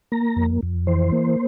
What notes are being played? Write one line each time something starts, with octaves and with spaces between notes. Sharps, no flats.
A#3 A#5
F2
F2
E3 C5
A#3